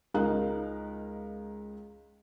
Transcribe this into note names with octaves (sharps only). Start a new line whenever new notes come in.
C#2 D#4 A#4 F5 A#5 F#6